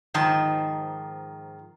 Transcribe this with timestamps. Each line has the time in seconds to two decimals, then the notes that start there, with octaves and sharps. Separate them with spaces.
0.14 G#2 D#3 F3 A5